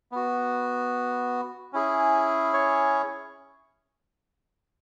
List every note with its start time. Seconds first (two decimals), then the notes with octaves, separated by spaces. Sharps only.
0.12 B3 F#4
1.73 C#4 E4 G#4
2.54 C#5